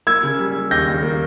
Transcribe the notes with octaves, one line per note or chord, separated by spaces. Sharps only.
A#3 E6 G#6
C#3
G3
G3
D#2 G6 A#6
D#2
A#3